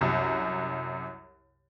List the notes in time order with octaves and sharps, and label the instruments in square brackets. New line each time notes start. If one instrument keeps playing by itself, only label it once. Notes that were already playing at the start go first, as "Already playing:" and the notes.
[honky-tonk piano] C2 F#2